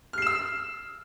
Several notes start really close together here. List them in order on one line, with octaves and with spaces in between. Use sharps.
F6 C7 E7 E6